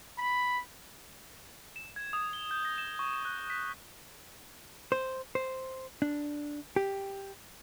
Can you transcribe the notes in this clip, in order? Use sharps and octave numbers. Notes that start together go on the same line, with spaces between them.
B5
E7
G#6
D#6
G7
G6
A#6
E7
C#6
E7
F#6
B6
C5
C5
D4
G4